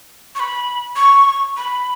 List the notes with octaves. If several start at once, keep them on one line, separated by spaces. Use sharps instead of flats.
C#6
B5
C#6
B5